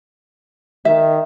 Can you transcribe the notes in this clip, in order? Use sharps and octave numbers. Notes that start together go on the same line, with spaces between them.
D#3 E5